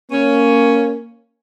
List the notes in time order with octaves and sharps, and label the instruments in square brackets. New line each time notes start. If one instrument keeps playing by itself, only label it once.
[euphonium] A#3 [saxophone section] C#4